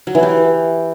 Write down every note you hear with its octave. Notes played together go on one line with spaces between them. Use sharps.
F#3
E3
G4